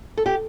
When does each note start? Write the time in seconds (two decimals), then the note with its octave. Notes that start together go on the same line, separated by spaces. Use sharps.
0.17 A4
0.26 G4